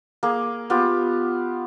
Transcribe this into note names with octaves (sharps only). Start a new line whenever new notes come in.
A#3 G#4
B3 F4 G4